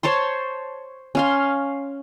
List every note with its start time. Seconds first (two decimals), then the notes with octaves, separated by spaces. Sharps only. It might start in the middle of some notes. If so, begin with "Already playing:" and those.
0.03 C5 C#5 A5 C6
1.15 C#4 F5 C6